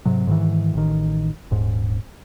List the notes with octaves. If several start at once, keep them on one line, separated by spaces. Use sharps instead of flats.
G#2 C3 F#3
G#2 D#3 E3
A1 D#3
D#1 G#2